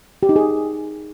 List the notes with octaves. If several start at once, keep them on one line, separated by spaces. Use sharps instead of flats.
G4
D#4
G#4